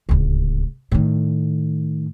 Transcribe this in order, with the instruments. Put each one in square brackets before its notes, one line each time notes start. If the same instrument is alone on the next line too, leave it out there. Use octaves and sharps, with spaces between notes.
[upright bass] D1 C#2
A2 D#3